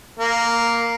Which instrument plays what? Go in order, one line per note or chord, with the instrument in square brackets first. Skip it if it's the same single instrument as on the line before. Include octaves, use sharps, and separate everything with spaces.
[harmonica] A#3